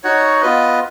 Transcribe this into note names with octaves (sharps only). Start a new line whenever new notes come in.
D#4 F#4 C#5 F#5
B3 F4 B4 D#5